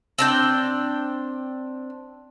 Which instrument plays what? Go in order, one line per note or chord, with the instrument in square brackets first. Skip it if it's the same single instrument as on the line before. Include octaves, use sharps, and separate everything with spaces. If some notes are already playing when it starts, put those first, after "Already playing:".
[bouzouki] C4 D4 G5